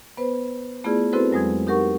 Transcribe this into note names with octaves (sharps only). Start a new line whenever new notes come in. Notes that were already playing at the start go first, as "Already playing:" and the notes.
B3 B4 C5
A3 B3 E4 F4 G#4 D5
C4 E4 F#4 A4 B4 C5
F2 F#3 G#3 D#6 G#6
D#4 G4 A#4 F#5 C#6